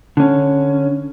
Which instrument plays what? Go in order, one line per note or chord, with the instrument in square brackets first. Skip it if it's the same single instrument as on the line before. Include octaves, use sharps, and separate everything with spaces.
[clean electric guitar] D3 C#4